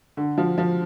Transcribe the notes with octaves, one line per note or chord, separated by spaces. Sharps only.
D3
F3
F3